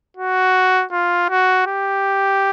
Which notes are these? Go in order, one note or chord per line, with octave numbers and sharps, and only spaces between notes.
F#4
F4
F#4
G4